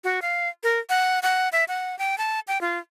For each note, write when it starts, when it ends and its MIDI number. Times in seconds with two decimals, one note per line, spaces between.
0.04 0.20 66
0.22 0.49 77
0.63 0.79 70
0.89 1.19 78
1.23 1.49 78
1.52 1.64 76
1.68 1.98 78
1.99 2.18 79
2.18 2.40 81
2.48 2.61 79
2.61 2.78 65